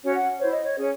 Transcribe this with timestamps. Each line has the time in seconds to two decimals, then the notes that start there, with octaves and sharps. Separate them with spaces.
0.03 C#4 F#4 C#5
0.15 F#5
0.40 E4 C5 C#5
0.51 D#5
0.63 C#5
0.76 C#4 G#4 C#5